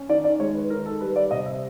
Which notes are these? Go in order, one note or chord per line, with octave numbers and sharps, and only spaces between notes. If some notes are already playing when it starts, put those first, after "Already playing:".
Already playing: C#4
D#3 D5
D5
G#3 C#5
B4
D#3 A#4
A4
G3 B4
D5
C3 D#5
E5